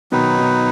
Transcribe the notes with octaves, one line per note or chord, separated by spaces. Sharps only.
B2 D#3 F#3 D#4 B4
B2